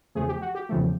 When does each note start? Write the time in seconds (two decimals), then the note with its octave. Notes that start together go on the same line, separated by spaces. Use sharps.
0.15 E2 C#3 F3 A3 G#4
0.29 G4
0.41 F#4
0.55 G4
0.69 E2 C#3 F3 A3